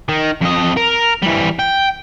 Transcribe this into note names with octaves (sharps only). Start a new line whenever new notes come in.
D#3
F2 D#5
A#4
E3 G3
G5